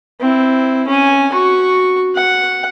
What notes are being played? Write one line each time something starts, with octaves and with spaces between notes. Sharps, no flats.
C4 E4
C#4 G#5
F#4 C#6
F#5